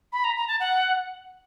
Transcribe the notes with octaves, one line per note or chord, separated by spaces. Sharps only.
B5
A#5
A#5
A5
F#5